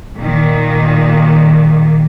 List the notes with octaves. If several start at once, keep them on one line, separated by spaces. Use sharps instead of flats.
A#2 D#3